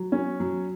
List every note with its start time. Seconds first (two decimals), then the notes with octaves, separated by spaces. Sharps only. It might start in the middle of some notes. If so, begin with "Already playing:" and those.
Already playing: F#3
0.12 C#4
0.40 F#3